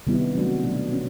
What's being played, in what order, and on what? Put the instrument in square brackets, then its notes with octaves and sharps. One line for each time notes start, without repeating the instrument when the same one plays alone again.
[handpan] C3 D#3 G3 B3 E4
F#3 A3 D4 F#4
B2 F#3 A3 D4
C#4 F#4